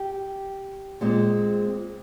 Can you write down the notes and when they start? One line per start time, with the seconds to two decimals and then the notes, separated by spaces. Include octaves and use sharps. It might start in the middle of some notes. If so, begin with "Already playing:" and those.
Already playing: G4
1.01 A#2 G#3 C4